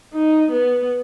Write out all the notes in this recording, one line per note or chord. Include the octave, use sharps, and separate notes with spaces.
D#4
B3